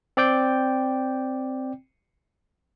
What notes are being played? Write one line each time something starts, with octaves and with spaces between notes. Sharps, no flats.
C4 D5 G5 G6